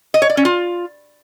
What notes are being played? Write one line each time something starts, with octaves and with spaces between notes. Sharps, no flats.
D#5
C#5
D5
C#4
F4